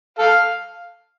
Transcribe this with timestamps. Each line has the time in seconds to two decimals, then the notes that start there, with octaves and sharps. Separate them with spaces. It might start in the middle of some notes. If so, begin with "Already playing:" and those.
0.18 A4 F5